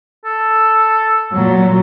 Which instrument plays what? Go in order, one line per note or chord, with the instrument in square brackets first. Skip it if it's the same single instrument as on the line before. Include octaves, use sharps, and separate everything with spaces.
[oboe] A4
[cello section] A#2 F#3